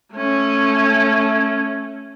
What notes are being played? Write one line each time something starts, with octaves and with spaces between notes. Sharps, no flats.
A3 C#4